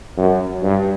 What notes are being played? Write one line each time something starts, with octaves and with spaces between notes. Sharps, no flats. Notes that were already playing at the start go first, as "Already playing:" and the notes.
F#2
G2